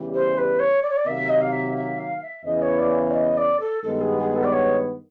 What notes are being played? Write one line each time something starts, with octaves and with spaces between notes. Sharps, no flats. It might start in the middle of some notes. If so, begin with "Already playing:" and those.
Already playing: E2 C#3 E3 G3
C5
B4
C#5
D5
C#5
D5
C3 D#3 F#3 A#3 E5
D#5
F5
E5
E5
F5
E5
E2 C#3 E3 D#5
C#5
D5
D5
D#5
D5
A4
G2 D#3 G#3 B3 A4
G#4
G#4
A4
D5
C#5